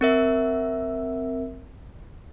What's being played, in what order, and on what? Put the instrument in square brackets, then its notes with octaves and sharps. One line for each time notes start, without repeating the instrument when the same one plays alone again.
[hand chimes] C4 A#4 E5